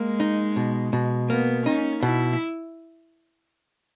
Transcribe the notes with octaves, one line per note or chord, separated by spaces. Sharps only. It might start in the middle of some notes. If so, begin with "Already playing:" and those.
Already playing: G#3 A#3
D#4
B2
B2
A#3 B3
C#4 D#4
B2 E4